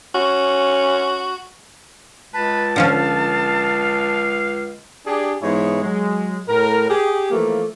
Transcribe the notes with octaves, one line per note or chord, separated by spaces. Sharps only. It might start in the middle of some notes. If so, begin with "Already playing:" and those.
C#4 F#4
C#2 B4 A5
D3 F3 C#4 F5
D4 G4 G#4
G#2 E3 G#3 B3 E4 C#5
F#3 G#3
A2 A#4
G4 G#4
E3 F3 A3 A#3